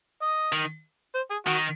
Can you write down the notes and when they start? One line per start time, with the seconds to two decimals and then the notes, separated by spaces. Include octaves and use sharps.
0.22 D#5
0.53 D#3
1.15 C5
1.31 G#4
1.46 D#3 F#4